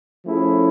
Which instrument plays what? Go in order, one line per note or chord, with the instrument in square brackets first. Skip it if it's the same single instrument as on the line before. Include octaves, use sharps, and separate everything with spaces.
[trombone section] F3 A3 C#4 E4 G#4